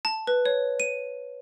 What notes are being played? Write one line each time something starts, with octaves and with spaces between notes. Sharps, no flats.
A5
B4
C#5
D#7